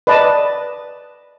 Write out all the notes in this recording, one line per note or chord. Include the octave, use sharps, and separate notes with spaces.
B4 D5 D#5 A5